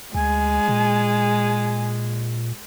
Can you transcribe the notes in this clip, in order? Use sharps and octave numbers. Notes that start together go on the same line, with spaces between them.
D2 G#3 G#5
A#2